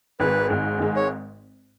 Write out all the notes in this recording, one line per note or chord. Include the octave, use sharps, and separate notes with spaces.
G#1 G#2 G#3 B4
G#1 G#2 G#3
G#1 G#2 G#3
C#5